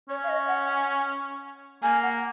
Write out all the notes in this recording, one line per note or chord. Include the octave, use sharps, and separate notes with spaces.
C#4 C#5
F5
D#5
F#5
G#5
A#3 G#5
F#5